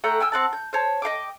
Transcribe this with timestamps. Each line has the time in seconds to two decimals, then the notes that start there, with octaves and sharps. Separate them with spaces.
0.04 A3 F#5 G5 A#5
0.20 G5 G#5 E6 F6
0.32 C4 F#5 A5
0.53 G6
0.73 C5 C#5 A5
1.02 D#5 F5 G5 D6